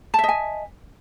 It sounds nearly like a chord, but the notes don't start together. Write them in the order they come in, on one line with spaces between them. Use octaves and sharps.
A5 E5 D#5 G#5